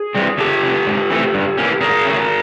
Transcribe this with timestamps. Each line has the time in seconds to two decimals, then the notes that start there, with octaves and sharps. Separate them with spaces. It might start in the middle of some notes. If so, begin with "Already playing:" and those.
Already playing: G#4
0.15 E3 G3 C4
0.38 E2 G4 A4
0.62 C3 E3
0.86 G#2
1.10 E3 A3 C4
1.34 G2
1.58 E3 G3 A#3 C#4
1.81 E2 G#4 A#4
2.05 C#3 F#3 A3 C#4